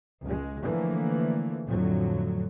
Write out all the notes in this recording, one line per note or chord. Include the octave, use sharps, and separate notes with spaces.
C#2 G#3
D3 E3 F3 A3 A#3
F2 A2 D3 F#3